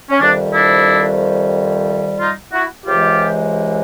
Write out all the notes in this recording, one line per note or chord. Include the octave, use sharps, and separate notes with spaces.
C#4
F2 C3 D#3 G3 D4
D4 E4
D#4 F4
E4 F#4
C#2 C3 E3 G#3 F4 G4